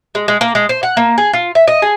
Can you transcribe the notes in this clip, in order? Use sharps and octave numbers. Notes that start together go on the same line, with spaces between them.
G#3
G#3
A#3
G#3
C5
F#5
A#3
G#4
F4
E5
D#5
G#4